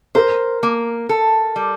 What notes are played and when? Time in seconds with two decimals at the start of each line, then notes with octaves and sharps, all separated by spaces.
0.15 A#4 C5
0.63 A#3
1.09 A4
1.56 G3